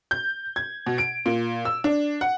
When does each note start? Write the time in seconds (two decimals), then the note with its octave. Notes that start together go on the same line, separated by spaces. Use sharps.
0.11 G6
0.56 G#6
0.86 B2
0.98 D7
1.26 A#2
1.65 E6
1.84 D4
2.21 F#5